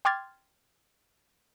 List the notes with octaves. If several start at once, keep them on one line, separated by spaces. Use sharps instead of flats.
G5 C6 D6 F6 G#6 A6